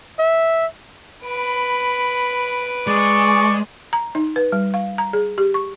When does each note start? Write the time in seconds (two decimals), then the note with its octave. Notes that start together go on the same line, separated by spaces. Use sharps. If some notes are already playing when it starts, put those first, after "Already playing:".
0.19 E5
1.24 B4 B5 D7
2.87 G#3 D5 C#6
3.93 A#5
4.15 D#4
4.36 B4
4.52 G3
4.74 F5
4.98 A#5
5.13 G#4
5.38 G4
5.54 C#6